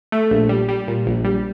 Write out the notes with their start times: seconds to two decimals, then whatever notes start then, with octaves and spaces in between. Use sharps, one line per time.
0.12 A3
0.31 A#1
0.49 G3
0.68 G3
0.88 A#2
1.07 A#1
1.25 G3